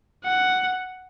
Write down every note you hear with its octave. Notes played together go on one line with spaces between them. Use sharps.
F#5